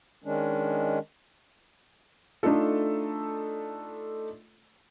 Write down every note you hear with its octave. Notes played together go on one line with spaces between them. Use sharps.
D#3 G#3 C#4 D4
A3 D4 D#4 F4 A4